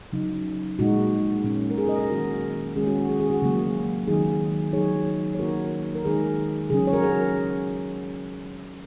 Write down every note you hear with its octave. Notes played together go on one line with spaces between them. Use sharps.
C#3 F#3 D#4
A#2 G#3 D#4 F#4
A#2 A#3 C#4
A#4
G#4
A#4 D#5
A#4 D#5
D#3 F#3 A#3 C#4 F#4 A#4
D#3 G#3 C#4 G#4
F#4
F#4
G#4
G#4
F#4
C#3 F#3 A#3
D#3 F#3 D#4 G#4
F#3 D#4 G#4 C#5
C#5
D#3 A#3 D#4 F#4 A#4
A#4
D#3 G#3 D#4 G#4
C#3 F#3 C#4 G#4
C#5
F#4 A#4
G#4